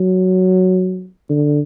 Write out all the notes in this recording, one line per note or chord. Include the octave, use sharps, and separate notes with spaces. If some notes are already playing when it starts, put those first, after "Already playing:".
Already playing: F#3
D3